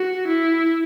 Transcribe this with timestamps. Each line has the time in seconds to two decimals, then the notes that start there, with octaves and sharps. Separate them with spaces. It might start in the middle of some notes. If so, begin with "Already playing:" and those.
Already playing: F#4
0.28 E4